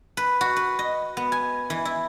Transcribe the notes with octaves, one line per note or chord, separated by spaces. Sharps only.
B4
F#4
B4
D#5
B3
G#5
E3
E4